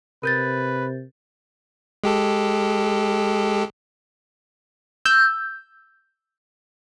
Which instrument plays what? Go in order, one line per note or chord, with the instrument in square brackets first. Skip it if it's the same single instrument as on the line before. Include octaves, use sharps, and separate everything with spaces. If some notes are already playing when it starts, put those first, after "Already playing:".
[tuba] C3 [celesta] A#4 G6 A6 [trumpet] B4
[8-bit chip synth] G#3 G4 A4
[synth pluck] E6 G6